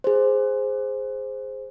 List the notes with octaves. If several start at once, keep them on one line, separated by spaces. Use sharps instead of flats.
G#4 C5